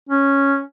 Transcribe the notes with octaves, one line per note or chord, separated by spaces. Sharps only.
C#4